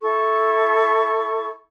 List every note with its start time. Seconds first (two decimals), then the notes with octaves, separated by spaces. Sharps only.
0.02 E4 A4 C#6